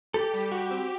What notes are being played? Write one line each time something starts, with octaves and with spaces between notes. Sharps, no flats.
G4 A4
G3
F#4
C4